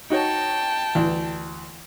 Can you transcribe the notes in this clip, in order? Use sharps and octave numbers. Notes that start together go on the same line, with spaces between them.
D#4 F#4 C#5 G5 A5
D2 E3